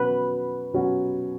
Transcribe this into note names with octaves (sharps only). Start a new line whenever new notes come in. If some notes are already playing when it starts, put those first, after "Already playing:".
Already playing: B2 F#3 C#4 F#4 B4
B2 F#3 C#4 F#4